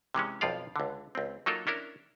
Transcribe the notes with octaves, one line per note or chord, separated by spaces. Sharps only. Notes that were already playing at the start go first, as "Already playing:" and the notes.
C3 E3 G#3 C#4
B1 F2 F3 F4 D5 F5
C#2 D3
C#2 C4
F#3 A#3 D#4 F4 A4 A#4
C#4 D4 E4 A#4